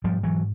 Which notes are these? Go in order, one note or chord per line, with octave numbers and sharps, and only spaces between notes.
G#2 F3 G3
E3 F#3